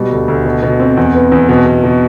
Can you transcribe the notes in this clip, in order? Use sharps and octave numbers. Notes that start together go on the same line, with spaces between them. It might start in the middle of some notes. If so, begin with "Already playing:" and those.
Already playing: B2 G3
D2
D2
B2
B2
C4
E2
B3
E2
B2
B2
B2